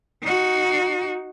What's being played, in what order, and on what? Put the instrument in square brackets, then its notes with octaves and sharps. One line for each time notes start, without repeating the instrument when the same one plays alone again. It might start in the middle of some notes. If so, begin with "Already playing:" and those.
[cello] D#4 F#4